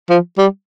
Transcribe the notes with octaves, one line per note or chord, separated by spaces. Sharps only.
F3
G3